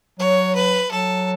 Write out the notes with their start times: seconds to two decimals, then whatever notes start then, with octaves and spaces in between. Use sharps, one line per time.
0.19 F#3 C#5
0.55 B4
0.91 F#3 A4